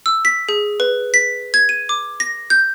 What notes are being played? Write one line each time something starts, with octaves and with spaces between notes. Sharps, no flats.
E6
B6
G#4
B4
B6
G#6
D#7
D6
A#6
G6